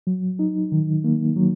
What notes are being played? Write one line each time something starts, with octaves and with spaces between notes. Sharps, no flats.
F#3
D#4
D#3
A#3
F#3